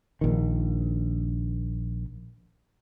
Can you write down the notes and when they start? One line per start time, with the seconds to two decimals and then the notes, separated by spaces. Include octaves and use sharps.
0.21 A#1 D#3